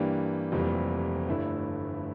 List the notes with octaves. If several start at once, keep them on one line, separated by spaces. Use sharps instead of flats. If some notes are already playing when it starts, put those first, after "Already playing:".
Already playing: G2 E3 A#3 D4 G4
F1 F2 E3 G3 A#3
G1 G2 D3 A3 E4